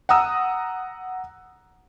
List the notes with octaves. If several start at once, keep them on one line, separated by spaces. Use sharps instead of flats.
F#5 A#5 D#6 E6